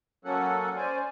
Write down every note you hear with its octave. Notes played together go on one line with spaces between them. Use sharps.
F#3 A#3 C#4 A4 F#5
C#4 C5 D5 G#5